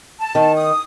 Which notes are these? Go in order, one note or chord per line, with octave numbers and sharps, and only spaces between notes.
A5
D#3
D#6